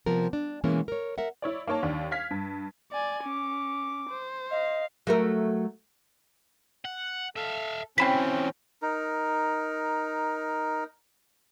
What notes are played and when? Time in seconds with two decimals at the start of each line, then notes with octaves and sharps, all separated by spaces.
0.06 C3 F3 B3 A#4
0.33 D4
0.64 B2 E3 G#3 A#3 B3 C#4
0.88 A#4 C#5
1.18 A#4 E5 F#5
1.42 E4 C#5 D5
1.67 A#3 D#4 C#5 A5
1.83 D#2 D4
2.11 F5 F6 G#6 B6
2.31 G2
2.92 D5 G#5
3.24 C#4 D6
4.09 C5
4.51 D#5 F5
5.07 F#3 A3 A#4
6.85 F#5
7.36 A4 E5 F5
7.98 E3 F#3 C4 C#4 G5 B5 B6
8.82 D#4 A#4